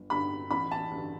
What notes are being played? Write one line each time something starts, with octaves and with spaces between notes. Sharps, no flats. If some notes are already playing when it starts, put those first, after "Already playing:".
Already playing: G1
G2 D3 B5
A1 B5
A5
G2 D3